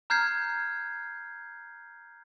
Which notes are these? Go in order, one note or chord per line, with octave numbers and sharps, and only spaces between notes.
A#5 F6 G6 G#6 C7